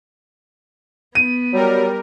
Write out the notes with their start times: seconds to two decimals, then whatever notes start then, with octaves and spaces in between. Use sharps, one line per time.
1.15 B3 D#7
1.53 F#3 G3 A#4